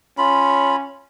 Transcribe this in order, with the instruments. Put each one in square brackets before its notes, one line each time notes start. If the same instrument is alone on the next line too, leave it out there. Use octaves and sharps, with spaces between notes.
[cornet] C#4 [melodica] F4 B5